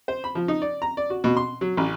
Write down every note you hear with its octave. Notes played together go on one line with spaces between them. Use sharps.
C5
B5
F3
D#4
D5
A#5
D5
F#4
B2
C6
F#3
A1